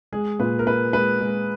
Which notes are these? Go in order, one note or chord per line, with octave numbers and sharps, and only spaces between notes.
G#3 G#4
A#2 B4
A#4
A#2 B4
G#3 B4
G#3